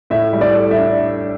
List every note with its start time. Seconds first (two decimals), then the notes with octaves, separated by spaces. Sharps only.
0.10 A2 E5
0.33 G3
0.41 D5
0.55 A4
0.71 E5
0.78 D4